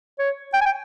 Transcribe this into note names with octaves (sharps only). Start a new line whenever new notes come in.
C#5
G5
G#5
G5